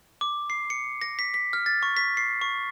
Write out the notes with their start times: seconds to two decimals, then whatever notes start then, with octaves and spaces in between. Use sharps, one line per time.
0.21 D6
0.50 C7
0.70 C#7
1.02 A#6
1.19 B6
1.34 B6
1.53 F6
1.66 A6
1.83 C#6
1.97 B6
2.17 C7
2.41 C#6